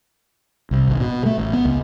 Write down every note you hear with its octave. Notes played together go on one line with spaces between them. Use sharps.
C2
G#1
B2
A3
A1
B3
C#2